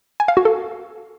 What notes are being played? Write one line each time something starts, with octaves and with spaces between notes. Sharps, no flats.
G#5
F5
F#4
A4